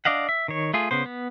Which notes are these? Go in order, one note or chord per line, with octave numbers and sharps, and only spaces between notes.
D4 D5 D#5 F5 F#5
E5
D#3 C#5
A3 F4 G#4
C#3 B3 C5
B3